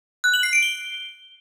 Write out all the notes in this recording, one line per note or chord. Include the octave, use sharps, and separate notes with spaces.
F#6
F#7
C7
D7
G7